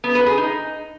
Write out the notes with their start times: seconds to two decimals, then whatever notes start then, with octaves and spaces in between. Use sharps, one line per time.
0.04 B3
0.15 B4
0.26 G#4
0.38 D#4